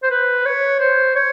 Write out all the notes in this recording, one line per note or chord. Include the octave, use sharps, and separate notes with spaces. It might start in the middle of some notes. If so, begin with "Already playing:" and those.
C5
B4
C#5
C5
C#5